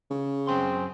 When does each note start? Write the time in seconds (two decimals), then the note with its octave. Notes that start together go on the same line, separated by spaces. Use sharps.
0.11 C#3
0.47 F#2 C4 G#4 C6